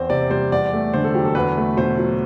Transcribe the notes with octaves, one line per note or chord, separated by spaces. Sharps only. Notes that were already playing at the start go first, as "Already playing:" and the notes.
Already playing: E2 C4 C5
C3 D5
G3 C5
E2 D5
A3
D3 C5
A4
F#3 G4
A4
E2 B4
A3
B2 C5
F#3